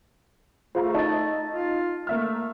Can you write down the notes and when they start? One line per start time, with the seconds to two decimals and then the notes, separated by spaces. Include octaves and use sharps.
0.75 A3 F4 G#4 C5 F5 A#5
0.94 D#4 A5 A6
1.51 F4
2.07 A3 A#3 E5 F6